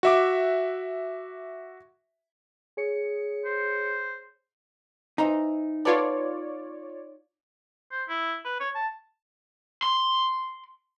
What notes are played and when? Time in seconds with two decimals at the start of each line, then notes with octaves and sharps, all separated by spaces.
0.03 F#4 E5 D6
2.77 G#4 C#5 C#7
3.45 C5
5.18 E3 D#4 C5 A#5
5.85 B3 F4 A4 B4 C#5 D5
7.92 C5
8.09 E4
8.45 B4
8.60 C#5
8.75 A5
9.83 C6